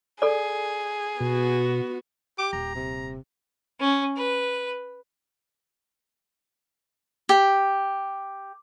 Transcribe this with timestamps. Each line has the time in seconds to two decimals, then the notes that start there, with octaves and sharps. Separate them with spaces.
0.22 G#4 A4 D5
1.21 B2 B3 F#4
2.38 G4 D6
2.53 D#1 A#5
2.75 C3
3.80 C#4
4.16 B4
7.29 G4